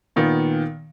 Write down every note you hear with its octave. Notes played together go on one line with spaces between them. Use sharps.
A#2 D#3 B3